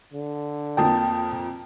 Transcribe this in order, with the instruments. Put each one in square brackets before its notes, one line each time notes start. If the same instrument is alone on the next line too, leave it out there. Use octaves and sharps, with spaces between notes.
[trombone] D3
[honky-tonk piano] F2 F3 A#3 [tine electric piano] G5 A5 D#6